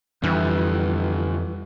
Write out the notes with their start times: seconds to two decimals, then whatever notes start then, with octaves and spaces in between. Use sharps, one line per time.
0.23 F2 D3 E3 G3